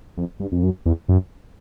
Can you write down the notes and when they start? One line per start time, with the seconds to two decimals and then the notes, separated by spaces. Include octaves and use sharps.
0.18 F2
0.40 G2
0.52 F2
0.63 F#2
0.86 E2
1.09 F#2